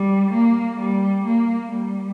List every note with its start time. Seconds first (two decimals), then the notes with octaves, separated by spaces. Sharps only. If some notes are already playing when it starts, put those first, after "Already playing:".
Already playing: G3
0.33 A#3
0.80 G3
1.25 A#3
1.72 G3